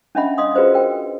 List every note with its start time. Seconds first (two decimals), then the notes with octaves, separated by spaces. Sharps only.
0.15 C#4 D4 D#5 E5 F#5 B5
0.38 D#5 F5 C6 D#6
0.55 F4 F#4 G#4 B4 C5 D#5
0.74 A#4 G5